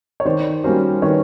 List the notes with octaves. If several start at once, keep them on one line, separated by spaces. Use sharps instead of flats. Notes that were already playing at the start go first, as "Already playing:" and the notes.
C#5
D#3 C5 D5
G3 A#3 C#4 F#4 A#4 C5
D#3 B4 C#5